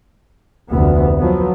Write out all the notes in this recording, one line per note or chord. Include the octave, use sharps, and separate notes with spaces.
F1 D2 B3
F3 F#3 B3